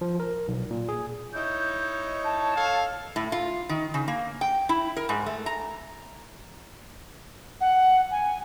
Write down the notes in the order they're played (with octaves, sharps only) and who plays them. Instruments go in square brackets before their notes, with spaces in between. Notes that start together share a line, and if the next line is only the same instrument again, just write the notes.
[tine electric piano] F3
A#4
B1
A#2
G#4
[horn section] D#4 E4 C#5 [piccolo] G6
[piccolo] A5
[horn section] A4 C#5 F5
[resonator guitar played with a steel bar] A2
F4
D#3
C#3
A#3
G5
E4
A#4
G#2
A3
A#5
[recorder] F#5
G#5